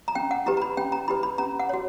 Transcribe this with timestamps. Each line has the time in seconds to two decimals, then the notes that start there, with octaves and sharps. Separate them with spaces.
0.08 A#5
0.15 C#4 G5
0.31 F#5
0.46 E4 G4 B4 A#5
0.57 A#5
0.62 B5
0.77 C#4 G5
0.92 A#5
1.08 E4 G4 B4 B5
1.23 B5
1.38 C#4 A#5
1.59 F#5
1.69 F#4 C#5